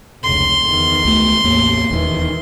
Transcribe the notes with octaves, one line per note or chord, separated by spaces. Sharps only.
F1 C#2 C6
E2 D#3
C#2 A3
A1 E2 A#3
D#1 E2 D#3 E3